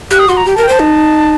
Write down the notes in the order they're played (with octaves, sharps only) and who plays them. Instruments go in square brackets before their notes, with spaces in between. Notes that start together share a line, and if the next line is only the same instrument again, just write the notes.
[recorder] G4 [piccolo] F#6
[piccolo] D#6
[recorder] F#4 [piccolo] C6
[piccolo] A#5
[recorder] G4
[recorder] A#4 [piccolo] A5
[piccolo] G5
[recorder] C5 [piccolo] A5
[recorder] D#4